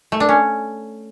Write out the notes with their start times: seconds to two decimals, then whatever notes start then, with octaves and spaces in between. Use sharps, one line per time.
0.12 A3
0.20 D4
0.29 C#4